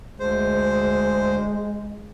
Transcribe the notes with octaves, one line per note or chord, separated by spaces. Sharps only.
D2 G#3 C5